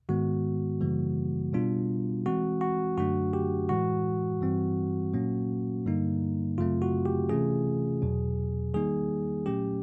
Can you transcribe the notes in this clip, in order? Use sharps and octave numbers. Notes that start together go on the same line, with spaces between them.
G#2 D#3 G#3 B3 F#4
F#2 C#3 E3 G3 A#3
B2 G3 B3 D4 F4
E3 G#3 C4 F#4
F#4
F#2 D3 F#3 A3 D4 F#4
G4
A2 E3 G#3 F#4
G2 E3 G3 C4
A#2 F#3 A#3 C#4
G2 D3 G3 A#3 D#4
F#2 C#3 F#3 A3 C4 F4
F#4
G4
C3 E3 A3 C#4 F4 G#4
E2 B2 F#3
D#3 G3 A#3 D#4 G#4
A#2 F#3 A3 C#4 G4